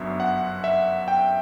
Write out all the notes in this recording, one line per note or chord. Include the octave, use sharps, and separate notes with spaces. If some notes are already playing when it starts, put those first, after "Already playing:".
Already playing: G1 F#2 D3 F#3 B3 E5
F#5
E5
G5